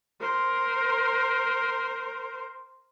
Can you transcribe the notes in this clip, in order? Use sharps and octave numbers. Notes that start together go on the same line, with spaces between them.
A#4 C5